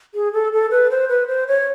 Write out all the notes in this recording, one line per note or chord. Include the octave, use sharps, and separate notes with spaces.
G#4
A4
A4
B4
C5
B4
C5
C#5